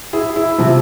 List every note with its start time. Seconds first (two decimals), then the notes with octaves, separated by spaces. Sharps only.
0.13 E4 G#4
0.36 E4
0.58 C3 F3